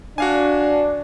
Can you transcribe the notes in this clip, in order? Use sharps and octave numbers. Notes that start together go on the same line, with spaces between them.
D4 F#4 F5 G#5